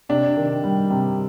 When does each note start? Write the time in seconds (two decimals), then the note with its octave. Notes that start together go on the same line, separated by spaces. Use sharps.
0.09 C3 D4
0.37 D#3
0.64 G3
0.90 C3